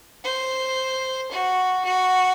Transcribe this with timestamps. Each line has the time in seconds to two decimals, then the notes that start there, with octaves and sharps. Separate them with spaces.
0.24 C5
1.31 F#4
1.84 F#4